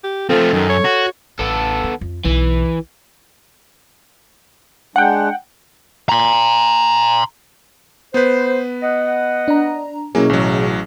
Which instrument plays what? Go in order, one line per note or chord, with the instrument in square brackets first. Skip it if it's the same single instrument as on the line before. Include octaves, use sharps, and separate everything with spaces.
[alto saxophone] G4
[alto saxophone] F3 [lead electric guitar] A3 C4 [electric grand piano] A4
[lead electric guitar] F#2 [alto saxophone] D#3
[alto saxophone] C#5
[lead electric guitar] F#4
[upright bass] A1 [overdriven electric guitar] B3 A4
[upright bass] D#3
F2
[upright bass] B1 [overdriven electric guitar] E3
[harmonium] G#3 D4 [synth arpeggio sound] F#5 G5
[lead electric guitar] A#5 C6
[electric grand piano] B3 B4 [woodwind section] C5
[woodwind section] D#5 F#5
[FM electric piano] D4 A#5
[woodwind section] B2 [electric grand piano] F#3 A#3 [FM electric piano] C#4 E4 G#4
[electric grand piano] A1 F#3